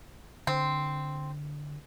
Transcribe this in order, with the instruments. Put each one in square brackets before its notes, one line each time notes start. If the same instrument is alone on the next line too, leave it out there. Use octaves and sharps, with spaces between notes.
[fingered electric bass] D3 [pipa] C4